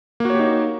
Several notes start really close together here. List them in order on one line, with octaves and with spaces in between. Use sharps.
A#3 F#4 C#5 G4 D#4